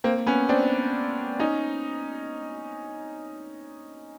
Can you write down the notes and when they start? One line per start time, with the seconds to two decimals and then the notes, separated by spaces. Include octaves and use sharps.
0.04 A#3 C4
0.27 B3 C#4
0.49 C4 D4
1.39 C#4 D#4